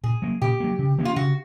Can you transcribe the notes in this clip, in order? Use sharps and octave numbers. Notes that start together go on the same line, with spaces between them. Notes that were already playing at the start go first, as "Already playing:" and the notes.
A#2 G#4
F#3 A#3
A#2 G4
F#3 A#3
C#3
F3 A#3 C#4
F4
C#3 F#4